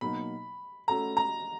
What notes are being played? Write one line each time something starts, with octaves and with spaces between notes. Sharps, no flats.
B2 F#3 A#3 D#4 B5
A3 C#4 F#4 A4 A#5
A#5